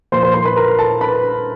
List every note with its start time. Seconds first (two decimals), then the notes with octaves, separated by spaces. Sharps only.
0.12 A#2 F3 A#3 C5 C6
0.23 C5 C6
0.34 C5 C6
0.45 B4 B5
0.56 A#4 A#5
0.78 A4 A5
1.01 B4 B5